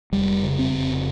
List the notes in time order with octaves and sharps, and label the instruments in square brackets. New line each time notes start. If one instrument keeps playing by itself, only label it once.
[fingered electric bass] F1 G3
C#3
C4
F1